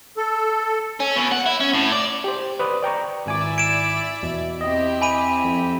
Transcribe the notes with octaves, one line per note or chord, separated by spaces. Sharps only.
A4
C#4
B2
F#5
E4
C#4
A2
D5
G4 C5
B4 C5 D5 D#6
D5 G5 A#5 C#6
G#1 E4 D5 E5 G#5 D6
G#6 D7 E7
E2 B2
C4 E4 G4 D#5
G#5 B5 D#7
F2